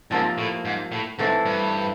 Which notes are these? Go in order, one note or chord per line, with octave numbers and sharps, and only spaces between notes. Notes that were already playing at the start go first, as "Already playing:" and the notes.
G#2 C3 F3 A#3
A2
G#2
A2
G#2 E3 A3 C4
G2